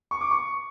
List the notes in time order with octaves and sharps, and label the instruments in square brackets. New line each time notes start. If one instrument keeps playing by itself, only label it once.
[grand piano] C#6
D6
C#6